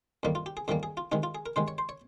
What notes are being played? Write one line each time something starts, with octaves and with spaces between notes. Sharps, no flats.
F2 D#3 G3 A#3
F4
G4
G#4
F2 D#3 G3 A#3 G#4
G#4
F4
C3 D#3 G#3 D#4
F4
G#4
A#4
C3 D#3 G#3 C5
C#5
C5
C#5